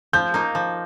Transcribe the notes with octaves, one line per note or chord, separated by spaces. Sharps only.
F3 G6
A#3 D#4
F3